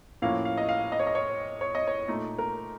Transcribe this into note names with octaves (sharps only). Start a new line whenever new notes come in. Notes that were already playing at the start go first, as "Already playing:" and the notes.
A2 F3 A#3 C#4 F5
F5
D#5
F5
D#5
C#5
D#5
C#5
C#5
D#5
C#5
A#2 A3 D#4
A#4